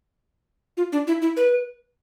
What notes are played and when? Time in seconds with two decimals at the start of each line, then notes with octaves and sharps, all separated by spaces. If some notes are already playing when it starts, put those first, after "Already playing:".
0.77 F4
0.92 D4
1.07 E4
1.22 E4
1.37 B4